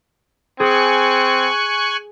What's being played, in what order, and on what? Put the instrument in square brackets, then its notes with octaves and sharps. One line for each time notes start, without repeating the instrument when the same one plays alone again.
[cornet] C4 [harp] G#4 [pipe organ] G#5 C#6 F#6